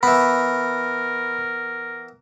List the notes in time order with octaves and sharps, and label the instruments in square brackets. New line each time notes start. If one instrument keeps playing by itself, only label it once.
[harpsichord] E3 B3 [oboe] A#4 [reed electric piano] B5